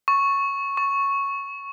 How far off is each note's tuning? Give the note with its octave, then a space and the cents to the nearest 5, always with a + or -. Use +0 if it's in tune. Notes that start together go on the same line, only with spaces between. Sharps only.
C#6 -5
C#6 -5